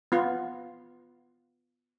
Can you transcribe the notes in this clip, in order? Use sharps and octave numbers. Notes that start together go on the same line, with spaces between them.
B3 F4